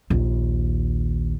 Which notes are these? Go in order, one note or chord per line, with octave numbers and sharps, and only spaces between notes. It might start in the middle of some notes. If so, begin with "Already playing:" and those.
A#1 D#2